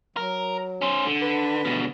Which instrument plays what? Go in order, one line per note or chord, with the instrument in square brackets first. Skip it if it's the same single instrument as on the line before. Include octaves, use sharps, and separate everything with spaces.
[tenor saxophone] F#3 [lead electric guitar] A#4
[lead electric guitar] C#4 C5
D3
[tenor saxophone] B4
[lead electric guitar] B2 D3